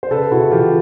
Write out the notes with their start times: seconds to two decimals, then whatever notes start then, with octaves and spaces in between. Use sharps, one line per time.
0.03 C5
0.11 C#3 A4 B4
0.31 C#3 E4 F#4
0.51 E3 F4 G4